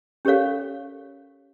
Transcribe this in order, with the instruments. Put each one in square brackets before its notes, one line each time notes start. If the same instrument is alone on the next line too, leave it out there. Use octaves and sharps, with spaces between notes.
[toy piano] C#4 G4 A4 A#4 C#5 F5